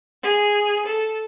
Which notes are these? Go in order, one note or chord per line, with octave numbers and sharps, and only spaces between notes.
G#4
A4